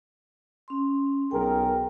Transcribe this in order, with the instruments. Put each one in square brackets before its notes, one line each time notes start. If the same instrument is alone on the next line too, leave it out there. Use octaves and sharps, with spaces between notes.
[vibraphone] C#4 C6
[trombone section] B1 G#4 A#4 [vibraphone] G5